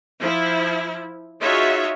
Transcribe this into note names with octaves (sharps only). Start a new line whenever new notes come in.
F3 E4
D#4 F4 F#4 G#4 C#5 E5